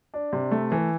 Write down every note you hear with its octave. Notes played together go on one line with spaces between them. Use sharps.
D4
C3
A3
E3